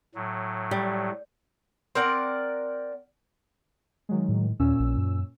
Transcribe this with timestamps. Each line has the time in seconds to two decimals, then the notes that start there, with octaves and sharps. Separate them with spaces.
0.15 A2 F#3
0.71 G3
1.95 C4 A#4 D5 F#5
4.09 D#3 F#3 G#3
4.29 A2
4.60 D#2 A#2 C#4 E6
4.79 A#1
4.97 F#2